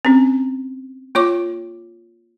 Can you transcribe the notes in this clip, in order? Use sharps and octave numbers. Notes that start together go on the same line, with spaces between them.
C4 C#4
A#3 F4 C#5 C#6 D6